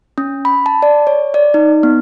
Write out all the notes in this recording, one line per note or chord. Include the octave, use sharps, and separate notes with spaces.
C#4
B5
A5
D5
C#5
D5
D#4
B3